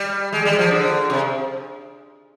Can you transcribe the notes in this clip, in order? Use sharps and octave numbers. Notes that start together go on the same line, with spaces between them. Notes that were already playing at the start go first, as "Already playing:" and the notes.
Already playing: G3
G#3
G3
F3
D3
C3